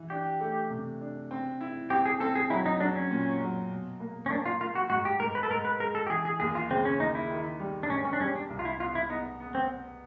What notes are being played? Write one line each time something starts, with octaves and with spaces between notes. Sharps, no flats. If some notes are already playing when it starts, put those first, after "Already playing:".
Already playing: E3
D4 G4
A3
C3
D4
C4
E4
C4 G4
G#4
C4 A4
G#4
F#3 E4
D#4
F#3 D4
C#4
A#2
F#3
B2
A#3
C#4
A#3 D4
F4
A#3 F4
F#4
G#2 F#4
G4
G#2 A#4
B4
A4
G#2 A#4
B4
G#3 A#4
A4
G4
E3 G#4
G#4
D#2 G#4
F4
C#3 C4
C#4
D#2 D#4
E4
D#3
G3
D4
G#2 C#4
C#4
D4
G3 C#4
D4
C2
F4
E4
B3 F4
E4
B3 D#4
B3
C4